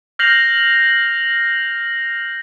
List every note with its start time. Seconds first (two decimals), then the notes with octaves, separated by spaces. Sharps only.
0.19 F6 G6 A#6 C7 F7 F#7